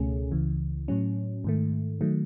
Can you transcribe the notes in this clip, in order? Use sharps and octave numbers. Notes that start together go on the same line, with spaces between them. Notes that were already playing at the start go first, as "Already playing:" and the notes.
Already playing: C#2 B2 A3 C#4 G#4
C#2 C#3 E3
A2 F#3 C#4
G#2 D#3 A3
D#3 F#3 A3